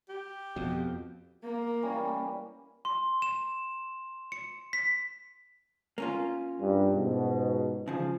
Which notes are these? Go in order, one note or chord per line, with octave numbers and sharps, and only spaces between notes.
G4
F2 B2
A#3
E3 G3 C#4
C6
E7
C#7
B6
A#3 C#4 F4
G2
G#2 B2
C#3 F3